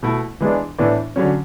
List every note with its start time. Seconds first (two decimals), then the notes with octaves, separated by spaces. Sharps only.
0.03 B2 A3 E4
0.40 E3 G#3 B3 D4
0.78 A2 E3 B3 D4
1.16 D3 F#3 C#4